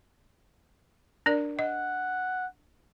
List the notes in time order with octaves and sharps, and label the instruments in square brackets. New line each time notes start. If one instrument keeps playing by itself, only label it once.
[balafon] D4 A#4 D5
[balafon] D#5 [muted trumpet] F#5